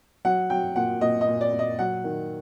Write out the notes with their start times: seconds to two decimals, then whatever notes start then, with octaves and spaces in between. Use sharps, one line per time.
0.25 F#3 F#5
0.50 F#3 G5
0.76 A#2 F#5
1.01 A#2 D#5
1.21 D#5
1.28 A#2
1.41 D5
1.53 A#2
1.59 D#5
1.79 F#3 F#5
2.04 D#3